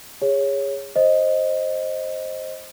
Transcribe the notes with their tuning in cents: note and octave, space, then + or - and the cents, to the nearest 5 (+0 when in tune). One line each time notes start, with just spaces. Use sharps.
G#4 -30 C#5 +0
C5 +15 D#5 +0